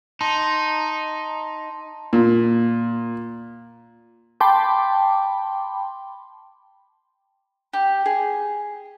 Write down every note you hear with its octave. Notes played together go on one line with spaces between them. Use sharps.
D#4 A5 C6
A#2
G5 A5 B5 C6 D6
G4
G#4